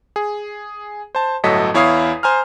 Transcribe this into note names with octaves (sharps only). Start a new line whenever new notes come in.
G#4
C5 A5
G1 A2 F#3 A4 D#5 B6
E2 E4 C#5 F5 D#6 C7
C5 G#5 A#5 F6